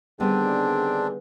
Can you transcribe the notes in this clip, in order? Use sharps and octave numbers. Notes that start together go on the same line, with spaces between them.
D3 D#3 G3 B3 C4 D4 G#4 B4